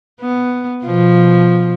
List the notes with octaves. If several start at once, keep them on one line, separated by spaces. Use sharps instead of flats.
B3
B2 F3